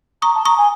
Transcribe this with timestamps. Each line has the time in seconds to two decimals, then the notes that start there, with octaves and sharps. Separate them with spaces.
0.22 A#5 C#6 D#6
0.35 A5
0.45 A#5 C#6 D#6
0.57 G#5